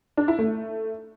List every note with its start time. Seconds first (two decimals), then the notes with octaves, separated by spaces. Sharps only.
0.17 D4
0.28 E4
0.39 A3